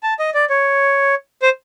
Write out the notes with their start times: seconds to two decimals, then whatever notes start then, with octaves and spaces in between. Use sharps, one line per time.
0.03 A5
0.19 D#5
0.34 D5
0.50 C#5
1.42 C5